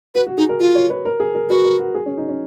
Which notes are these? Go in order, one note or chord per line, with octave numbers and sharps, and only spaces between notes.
F#4 B4
F#4
D#4 G#4
A#4
F4 A#4
C#5
B4
A#4
G#4
A#4
F#4 B4
A#4
F#4
G#4
C#4
D#4
C#4